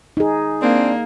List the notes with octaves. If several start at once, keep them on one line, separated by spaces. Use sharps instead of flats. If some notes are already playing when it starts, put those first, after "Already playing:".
D#4 G#4
A#3 C4 D4